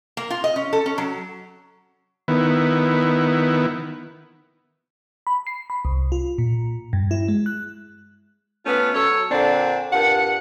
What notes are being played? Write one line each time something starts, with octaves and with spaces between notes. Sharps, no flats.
A#3
F4
D#5
C#4
A4
C#4
F#3
D#3 B3 E4
B5
C7
B5
C2
F4
A#2
G2
E4
G#3
F#6
A3 B3 C#4 F4
F#3 A4 C#5
A#2 D3 C4 D4
G2 A#2 F#5